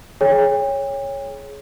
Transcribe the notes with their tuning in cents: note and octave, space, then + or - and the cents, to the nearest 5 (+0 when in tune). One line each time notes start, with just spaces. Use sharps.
G#4 +20 C#5 +0 G5 +40